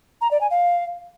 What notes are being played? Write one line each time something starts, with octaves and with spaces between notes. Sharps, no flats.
A#5
D5
G#5
F5